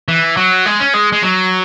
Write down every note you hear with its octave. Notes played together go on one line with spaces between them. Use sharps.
E3
F#3
G#3
C#4
G#3
G#3
F#3